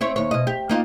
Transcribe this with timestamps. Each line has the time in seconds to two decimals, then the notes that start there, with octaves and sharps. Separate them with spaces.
0.01 C4 E4 C#5
0.16 D#2 C#5
0.31 B2 D#5
0.47 G4
0.69 A#3 D#4 F4